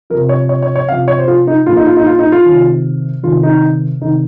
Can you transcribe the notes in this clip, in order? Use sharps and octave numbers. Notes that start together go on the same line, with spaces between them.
C3 F3 A#4
C#5
C#5
C#5
C#5
C3 F3 F5
C#5
C5
F4
D#4
A#2 F3 F4
D#4
F4
D#4
F4
D#4
F4
C3 D#3
C3 D#3 F4
D#4
C3 D#3 D#4